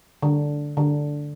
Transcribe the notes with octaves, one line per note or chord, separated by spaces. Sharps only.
D3
D3